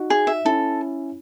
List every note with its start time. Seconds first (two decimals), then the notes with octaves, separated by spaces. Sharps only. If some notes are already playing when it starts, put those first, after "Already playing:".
Already playing: D#4 F#4
0.10 G#4
0.27 E5
0.45 C#4 E4 A4